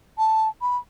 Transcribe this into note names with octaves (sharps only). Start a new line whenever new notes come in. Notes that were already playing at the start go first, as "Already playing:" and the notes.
A5
B5